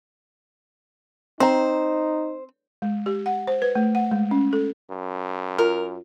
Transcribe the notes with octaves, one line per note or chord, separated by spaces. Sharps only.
C4 D#4 C5 A#5
G#3
G4
F#5
C5
B4
A3
F#5
G#3
C#4
A4
F#2
F4 A#4